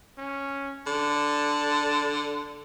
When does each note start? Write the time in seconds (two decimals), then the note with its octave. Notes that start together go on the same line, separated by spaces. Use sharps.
0.18 C#4
0.86 D3 A5